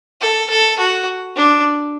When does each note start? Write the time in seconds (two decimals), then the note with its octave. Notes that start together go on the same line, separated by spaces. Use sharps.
0.21 A4
0.50 A4
0.79 F#4
1.36 D4